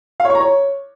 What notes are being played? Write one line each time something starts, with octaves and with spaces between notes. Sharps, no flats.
F5
C#5
C#6
A#5
C#5